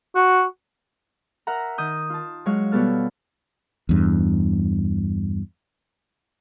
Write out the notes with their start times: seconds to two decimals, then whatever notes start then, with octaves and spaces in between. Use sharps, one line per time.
0.16 F#4
1.47 A#4 E5 F#5 A#5
1.78 D#3 D#6 G6
2.10 F4 A5
2.46 F#3 G#3 F#4 C#5 F5
2.72 B2 G3 B3 A4 F6
3.89 E2 G2